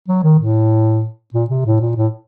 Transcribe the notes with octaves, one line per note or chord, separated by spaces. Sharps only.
F#3
D#3
A2
A#2
C3
A2
A#2
A2